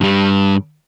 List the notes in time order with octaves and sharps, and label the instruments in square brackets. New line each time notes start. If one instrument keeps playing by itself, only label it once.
[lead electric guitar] G2 G3